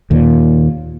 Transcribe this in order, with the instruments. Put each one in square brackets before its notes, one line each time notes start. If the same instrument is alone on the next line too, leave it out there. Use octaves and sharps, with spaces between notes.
[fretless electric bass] D#2 A#2